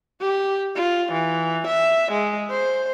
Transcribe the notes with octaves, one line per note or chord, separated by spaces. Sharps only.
G4
F4
E3
E5
G#3
C5